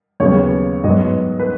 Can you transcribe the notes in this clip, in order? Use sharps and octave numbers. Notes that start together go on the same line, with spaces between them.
D#2 C#3 F#3 B3 C#5
G#2 F#3 B3 D#5
B4